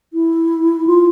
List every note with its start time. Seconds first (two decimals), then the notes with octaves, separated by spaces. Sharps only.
0.13 E4
0.87 F4